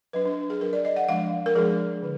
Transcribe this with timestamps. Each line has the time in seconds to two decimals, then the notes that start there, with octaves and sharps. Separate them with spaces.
0.13 F#3 D4 B4
0.25 D4
0.50 G#4
0.61 F#3 A#4
0.65 D4
0.73 D5
0.85 D#5
0.96 F#5
1.08 F3 G#3 D4 F5
1.46 A#4
1.55 F3 G#3 D4 G#4
2.03 D3